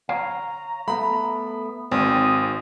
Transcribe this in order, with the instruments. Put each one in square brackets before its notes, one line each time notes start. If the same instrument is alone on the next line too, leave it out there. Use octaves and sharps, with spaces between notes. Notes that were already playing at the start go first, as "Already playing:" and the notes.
[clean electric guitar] C#5 F5 [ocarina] A#5
[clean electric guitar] A3 B3 [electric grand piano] B5
[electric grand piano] G#1 [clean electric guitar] C4 [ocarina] D#6